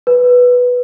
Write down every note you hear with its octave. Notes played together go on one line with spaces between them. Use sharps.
B4